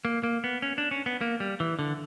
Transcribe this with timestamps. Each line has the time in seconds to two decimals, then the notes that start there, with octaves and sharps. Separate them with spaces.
0.05 A#3
0.23 A#3
0.44 B3
0.62 C#4
0.78 D4
0.91 C#4
1.06 B3
1.21 A#3
1.40 G3
1.60 E3
1.79 D3